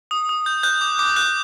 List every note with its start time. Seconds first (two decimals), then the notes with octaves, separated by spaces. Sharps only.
0.11 D#6
0.29 D#6
0.46 G6
0.63 F#6 G6
0.81 D6
0.99 D6
1.16 F#6